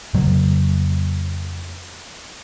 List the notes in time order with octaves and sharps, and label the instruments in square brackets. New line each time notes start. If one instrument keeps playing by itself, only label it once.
[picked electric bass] F2 C#3 F#3 A#3